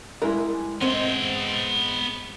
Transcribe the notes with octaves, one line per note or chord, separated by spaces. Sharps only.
G3 G#3 E4 A#4
G#2 G#3 B3 C4 E5 G5